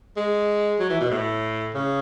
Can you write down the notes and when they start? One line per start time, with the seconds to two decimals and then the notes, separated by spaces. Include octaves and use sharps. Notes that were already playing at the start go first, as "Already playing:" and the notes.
0.17 G#3
0.79 F#3
0.90 E3
1.01 B2
1.11 A2
1.74 C#3